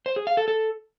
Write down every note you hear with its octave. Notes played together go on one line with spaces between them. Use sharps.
C5
G#4
F5
A4
A4